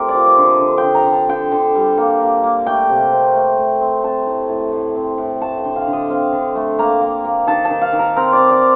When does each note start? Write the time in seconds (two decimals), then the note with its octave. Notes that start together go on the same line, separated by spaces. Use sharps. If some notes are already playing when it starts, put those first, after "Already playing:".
Already playing: A3 C4 F4 G4 A#4
0.09 D5
0.15 F3
0.26 D5
0.38 D3
0.44 D#5
0.60 D3
0.78 G5
0.84 D3
0.95 A#5
1.06 D3
1.12 A5
1.29 D3 G5
1.52 D3
1.75 G3
1.98 A#3
2.20 A#3
2.44 A#3
2.66 A3 G5
2.89 C3
3.12 C4
3.35 A3
3.58 A3
3.81 C4
4.03 C4 A5
4.27 A2
4.49 A2
4.72 A2
4.95 C4
5.18 A2
5.41 A3 A5
5.58 G5
5.64 D3
5.76 F5
5.87 D3
5.93 D#5
6.10 C4 F5
6.33 D3
6.55 A3
6.79 A#3 A#5
7.01 A#3
7.25 A#3
7.47 D#3 A5
7.65 A5
7.71 D#3
7.82 F5
7.92 D#3
7.99 A#4
8.16 C4 A#4
8.33 D5
8.39 C4
8.50 D5